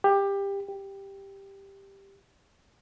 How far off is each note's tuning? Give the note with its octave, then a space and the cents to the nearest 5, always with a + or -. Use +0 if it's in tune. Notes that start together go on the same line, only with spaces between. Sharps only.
G4 +20
G4 +5